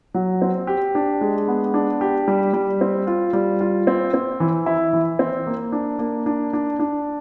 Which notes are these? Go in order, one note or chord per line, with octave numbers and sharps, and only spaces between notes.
F#3
C4
G4
D4
G#3
B3
D4
G4
G3
G3
C4
F4
G3
F4
C4
C4
E3
E4
E3
C4
A#3
D4
A#3
D4
D4
D4